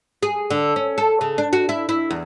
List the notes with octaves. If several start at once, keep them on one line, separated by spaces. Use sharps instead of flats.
G#4
D3
C#4
A4
C#3
D4
F#4
E4
E4
E2